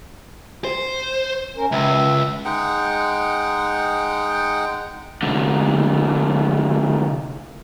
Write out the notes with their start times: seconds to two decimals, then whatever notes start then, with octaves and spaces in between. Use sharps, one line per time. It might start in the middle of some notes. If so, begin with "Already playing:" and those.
0.65 C5
1.57 C#4 A#4
1.72 C#2 E5
2.45 G#3 D#4 F#5 G5
5.22 C2 D3